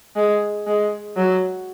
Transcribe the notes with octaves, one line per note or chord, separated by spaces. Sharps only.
G#3
G#3
F#3